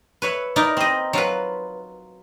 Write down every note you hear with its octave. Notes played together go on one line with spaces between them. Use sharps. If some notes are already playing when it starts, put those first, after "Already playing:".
B4 C#5 E5
D#4 E4 A#4 D5
C4 D#5
F#3 F4 B4